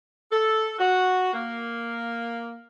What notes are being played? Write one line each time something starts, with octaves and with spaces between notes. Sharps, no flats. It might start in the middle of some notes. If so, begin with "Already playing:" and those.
A4
F#4
A#3